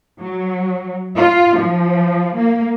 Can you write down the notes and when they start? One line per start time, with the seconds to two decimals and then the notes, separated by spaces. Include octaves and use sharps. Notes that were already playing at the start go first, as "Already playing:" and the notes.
0.20 F#3
1.16 F4
1.58 F3
2.35 A#3